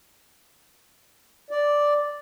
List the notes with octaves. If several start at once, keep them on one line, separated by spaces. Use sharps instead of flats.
D5